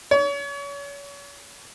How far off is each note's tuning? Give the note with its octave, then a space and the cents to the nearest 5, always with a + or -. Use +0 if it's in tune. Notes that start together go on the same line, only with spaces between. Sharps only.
C#5 +35